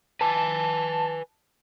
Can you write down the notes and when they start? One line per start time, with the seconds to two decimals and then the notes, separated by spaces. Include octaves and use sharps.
0.21 B4 G#5 A5